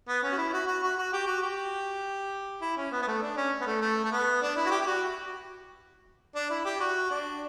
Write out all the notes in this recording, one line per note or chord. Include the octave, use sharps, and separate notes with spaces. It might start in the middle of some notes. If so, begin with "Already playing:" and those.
B3
C#4
F#4
E4
F#4
F#4
F#4
F#4
G4
F#4
G4
E4
C#4
B3
B3
A3
D4
C#4
B3
A3
A3
A3
B3
D4
E4
F#4
G4
G4
F#4
D4
E4
G4
F#4
D4